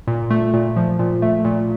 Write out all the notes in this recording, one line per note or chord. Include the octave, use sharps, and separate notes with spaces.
A#2
A3
A#2
F3
A#2
A3
A#2